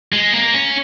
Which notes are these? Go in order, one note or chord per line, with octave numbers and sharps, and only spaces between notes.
G#3
A#3
C#4